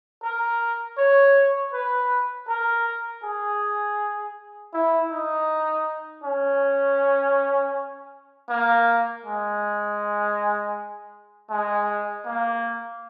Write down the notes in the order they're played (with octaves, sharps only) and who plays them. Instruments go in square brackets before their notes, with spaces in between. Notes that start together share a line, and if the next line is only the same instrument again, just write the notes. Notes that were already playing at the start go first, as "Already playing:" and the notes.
[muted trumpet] A#4
C#5
B4
A#4
G#4
E4
D#4
C#4
A#3
G#3
G#3
A#3